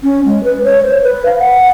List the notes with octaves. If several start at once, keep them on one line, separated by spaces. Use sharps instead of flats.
C#4
G#3
B4
C#5
C5
B4
F5
F#5